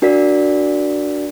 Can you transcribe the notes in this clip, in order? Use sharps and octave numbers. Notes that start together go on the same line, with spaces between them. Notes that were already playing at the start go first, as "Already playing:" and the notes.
D4 F#4 A#4 D5 B6